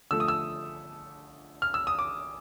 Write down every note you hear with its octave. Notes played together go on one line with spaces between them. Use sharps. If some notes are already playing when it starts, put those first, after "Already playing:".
D3 F3 A3 E6
D#6
E6
F6
E6
D#6
D6